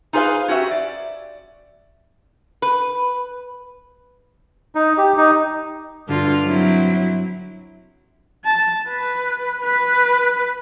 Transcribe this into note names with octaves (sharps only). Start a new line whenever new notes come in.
D#4 F4 G#4 B4 C5 F5
C#4 F#4 G4 E5
D5
B4
D#4
G4
D#4
G2 D3 F4
F#3 C4 E4
A5
B4
B4